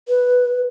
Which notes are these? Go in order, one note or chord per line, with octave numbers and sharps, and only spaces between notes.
B4